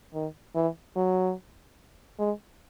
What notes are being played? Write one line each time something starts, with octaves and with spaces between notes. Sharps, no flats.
D#3
E3
F#3
G#3